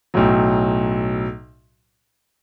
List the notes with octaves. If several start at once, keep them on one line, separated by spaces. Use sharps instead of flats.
B1 A2 F#3